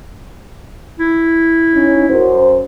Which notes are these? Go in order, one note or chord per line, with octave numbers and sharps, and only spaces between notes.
E4
C#4 D#4
F#2 C5